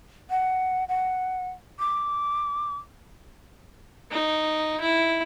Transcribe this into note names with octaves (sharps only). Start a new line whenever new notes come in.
F#5
F#5
D6
D#4
E4